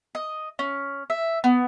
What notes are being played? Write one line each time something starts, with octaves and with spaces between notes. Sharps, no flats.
D#5
C#4
E5
B3